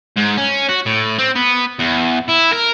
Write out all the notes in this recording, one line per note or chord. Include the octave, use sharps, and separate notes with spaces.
G#2
C#4
F#4
A2
C4
B3
E2
E4
A#4